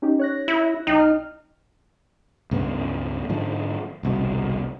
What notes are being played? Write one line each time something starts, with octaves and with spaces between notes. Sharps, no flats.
C#4 D#4 G4
C#5 F#6 A#6
E4
B1 D#4 G5
F6
C#2 G2 B3
G#2 D3 F3
G1 C2 B2